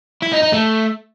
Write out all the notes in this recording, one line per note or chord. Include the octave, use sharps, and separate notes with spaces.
E4
D#4
D#4
A3